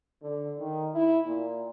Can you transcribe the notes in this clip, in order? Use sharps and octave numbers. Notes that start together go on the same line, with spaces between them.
D3
D#3
E4
A#2